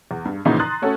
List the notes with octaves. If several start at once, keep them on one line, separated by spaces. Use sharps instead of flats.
E2
G2
A#2 C#3 E3 F3 D#4 F#4
A#5 C6 D#6 F#6 A6
A3 C#4 F#4 A4